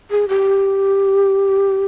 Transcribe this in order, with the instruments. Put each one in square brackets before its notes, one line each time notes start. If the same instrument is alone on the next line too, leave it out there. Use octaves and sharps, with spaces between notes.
[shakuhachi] G#4
G4